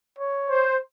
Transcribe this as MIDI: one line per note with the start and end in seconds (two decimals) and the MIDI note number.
0.19 0.69 73
0.50 0.77 72